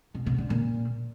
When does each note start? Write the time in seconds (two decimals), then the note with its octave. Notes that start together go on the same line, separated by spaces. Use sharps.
0.14 B2
0.26 B2
0.38 D3
0.50 A#2